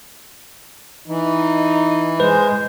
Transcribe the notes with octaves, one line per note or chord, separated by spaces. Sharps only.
E3 D#4
G#3 B4 C5